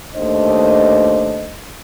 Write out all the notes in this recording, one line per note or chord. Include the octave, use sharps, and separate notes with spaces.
D#2 A3 D4 C5 D#5